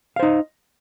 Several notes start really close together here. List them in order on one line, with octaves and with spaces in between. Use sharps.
F5 C5 D#4